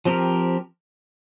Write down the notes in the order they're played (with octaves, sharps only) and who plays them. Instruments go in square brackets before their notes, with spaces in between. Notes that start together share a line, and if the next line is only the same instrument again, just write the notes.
[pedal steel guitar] F3 C4 G4 A#4